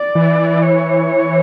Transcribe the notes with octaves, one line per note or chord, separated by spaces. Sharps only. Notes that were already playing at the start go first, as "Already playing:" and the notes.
Already playing: D5
E3
C#5